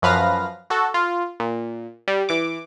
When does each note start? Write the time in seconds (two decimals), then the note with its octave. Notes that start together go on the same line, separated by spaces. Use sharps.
0.02 F#2 F3 B4 F5 A#6
0.70 F#4 A4
0.94 F4
1.40 A#2
2.08 G3
2.29 E3 D6